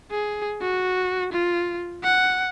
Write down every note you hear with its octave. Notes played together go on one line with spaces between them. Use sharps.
G#4
F#4
F4
F#5